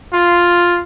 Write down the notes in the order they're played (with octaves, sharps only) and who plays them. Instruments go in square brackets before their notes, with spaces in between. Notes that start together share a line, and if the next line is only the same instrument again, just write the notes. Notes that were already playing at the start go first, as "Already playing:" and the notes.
[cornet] F4